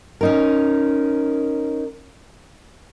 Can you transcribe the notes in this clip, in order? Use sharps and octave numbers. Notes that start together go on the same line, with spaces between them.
C#4 D#4 A#4